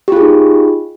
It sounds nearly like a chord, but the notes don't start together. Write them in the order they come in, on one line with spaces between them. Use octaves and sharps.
G4 F4 G#4 D#4